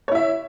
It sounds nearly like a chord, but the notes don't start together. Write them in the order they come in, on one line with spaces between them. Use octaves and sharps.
C#5 E4 E5